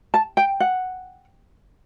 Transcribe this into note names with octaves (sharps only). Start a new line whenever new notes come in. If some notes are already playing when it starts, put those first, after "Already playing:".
A5
G5
F#5